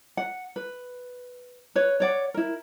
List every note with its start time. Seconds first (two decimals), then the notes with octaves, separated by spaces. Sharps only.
0.17 F#5
0.56 B4
1.76 B4 C#5
2.00 C#5 D5 F#5
2.34 E4 A#4